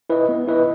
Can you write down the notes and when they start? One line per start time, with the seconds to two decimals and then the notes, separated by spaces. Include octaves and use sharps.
0.10 E4 B4 D#5
0.29 B3
0.48 E4 B4 D#5